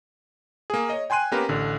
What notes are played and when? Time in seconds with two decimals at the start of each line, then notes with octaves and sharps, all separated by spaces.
0.70 A#3 G#4
0.89 C#5 D#5
1.10 G5 G#5 C6 F#6 D#7
1.32 A#3 B3 C#4 G4 A#4 B4
1.49 A1 D3